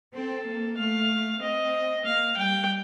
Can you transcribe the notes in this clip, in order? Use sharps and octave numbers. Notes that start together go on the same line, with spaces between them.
C4 A4
A#3
A3 F5
C4 D#5
A#3 F5
G3 G5